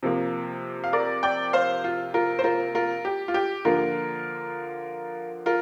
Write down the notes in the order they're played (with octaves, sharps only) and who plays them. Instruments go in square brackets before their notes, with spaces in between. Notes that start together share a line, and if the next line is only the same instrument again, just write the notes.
[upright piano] C3 F3 A#3
F5
A#4 D5
D5 G5
C5 F5
F4
F4 A#4
C5
F4 A#4
F4 A#4
G4
F4
G4
D3 F3 A#3 F4 A#4
F4 A#4